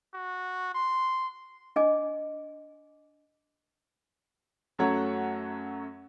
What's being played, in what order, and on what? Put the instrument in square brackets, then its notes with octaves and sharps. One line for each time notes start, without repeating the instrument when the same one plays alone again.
[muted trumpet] F#4
C6
[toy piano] D4 D#5 G#5 D6
[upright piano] F#2 F#3 A3 C#5 F#5